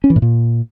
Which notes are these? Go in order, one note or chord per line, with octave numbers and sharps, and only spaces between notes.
C#4
E3
A2
A#2